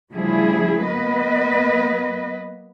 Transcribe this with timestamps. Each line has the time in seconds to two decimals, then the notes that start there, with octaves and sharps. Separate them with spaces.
0.14 D2 C#3 F3 G3 E4 G#4
0.87 F#3 A#3 B3 B4 D#5